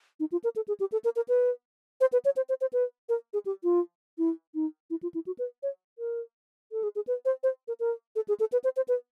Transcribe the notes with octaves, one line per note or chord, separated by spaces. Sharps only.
D#4
F4
A#4
A4
G#4
G4
A4
A#4
A#4
B4
C5
B4
C#5
C5
C5
C5
B4
A#4
G#4
G4
F4
E4
D#4
E4
F4
E4
F#4
B4
C#5
A#4
A4
G#4
G#4
B4
C5
C5
A#4
A#4
A4
G#4
A4
B4
C5
C5
B4